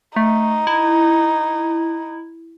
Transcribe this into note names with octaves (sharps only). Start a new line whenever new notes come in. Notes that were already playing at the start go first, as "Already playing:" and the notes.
A3 D#4
E4